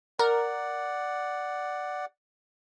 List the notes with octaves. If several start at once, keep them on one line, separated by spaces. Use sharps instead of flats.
A#4 D5 F#5